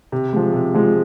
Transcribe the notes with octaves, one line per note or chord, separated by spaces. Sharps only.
C3
F3 G#3
C3
F3 G#3